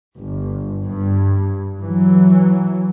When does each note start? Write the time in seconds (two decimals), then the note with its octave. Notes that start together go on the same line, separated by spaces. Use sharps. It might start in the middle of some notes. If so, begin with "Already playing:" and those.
0.17 G1
0.85 G2
1.82 E3 F#3